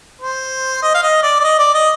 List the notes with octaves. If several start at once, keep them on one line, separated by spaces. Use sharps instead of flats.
C5
D#5
F5
D#5
D5
D5
D#5
D5
D#5